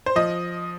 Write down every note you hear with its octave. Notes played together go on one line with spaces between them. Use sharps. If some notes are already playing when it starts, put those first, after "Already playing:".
C5
F3 D#5